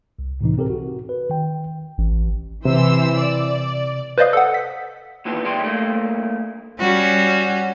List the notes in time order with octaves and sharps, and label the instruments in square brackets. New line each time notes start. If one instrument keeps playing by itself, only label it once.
[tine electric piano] C2
A2 C3 E3 D#4
C4 G4 A4 A#4
F#4
B4
D#3 G5
[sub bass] A1
[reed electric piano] C3 [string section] E3 C5 E6
[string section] D5
[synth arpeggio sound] B4 C5 D5 D#5 F5 D#6
A4 F#5
B6
[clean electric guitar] D#2 A#2 E3 B3
D#2 G3 G#3 G4 C6
G2 A3 A#3
[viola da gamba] G3 C#4 F#4